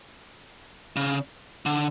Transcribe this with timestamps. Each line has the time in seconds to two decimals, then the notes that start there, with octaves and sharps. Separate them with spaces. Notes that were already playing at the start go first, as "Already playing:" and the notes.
0.96 C#3
1.66 D3